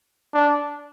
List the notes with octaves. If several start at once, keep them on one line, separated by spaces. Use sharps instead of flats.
D4